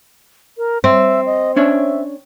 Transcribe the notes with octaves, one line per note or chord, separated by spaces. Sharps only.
A#4
C4 E5
D#5
C#4 D4 C#5 E5